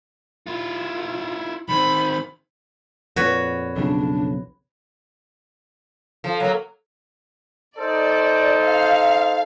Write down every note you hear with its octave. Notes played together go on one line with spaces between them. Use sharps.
E4 F4
D#3 C4 B5
F2 A#2 F#4 B4 C#5
B1 F2 C#3 D4
F3 A4
F#3 A#3
D#4 A4 C5 D5
F5